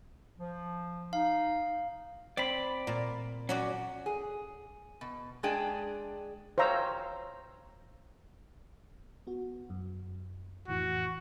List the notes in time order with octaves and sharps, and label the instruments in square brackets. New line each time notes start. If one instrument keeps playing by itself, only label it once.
[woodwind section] F3
[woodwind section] D#4 [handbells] F5
[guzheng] C4 [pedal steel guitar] D5 B5
[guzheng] A#2
[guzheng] F#3 F#4 D5 [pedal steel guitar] C#4
[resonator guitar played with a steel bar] G#4
B2
G#3 D4 G#4 D5 G5 A5
[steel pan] C5 C#5 F5 A#5 E6
[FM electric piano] B3 F#4
F#2
[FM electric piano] F2 A2 E3 [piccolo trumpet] F#4